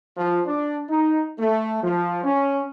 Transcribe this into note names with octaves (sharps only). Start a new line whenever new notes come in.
F3
D4
D#4
A3
F3
C#4